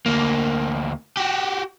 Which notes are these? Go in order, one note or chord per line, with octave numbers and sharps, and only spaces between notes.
D2 A#3
F#4 G4